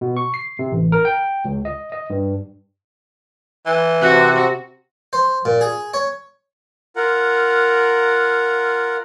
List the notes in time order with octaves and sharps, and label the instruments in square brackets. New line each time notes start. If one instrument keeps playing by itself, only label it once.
[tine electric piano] B2
C#6
C7
C3
A1
A#4
G5
C#2
D#5
D#5
G2
[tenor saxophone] E3
[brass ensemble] C3 [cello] F#4 [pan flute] F#6
[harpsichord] C5
A#2
G#4
C#5
[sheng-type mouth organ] F4 A#4 F#5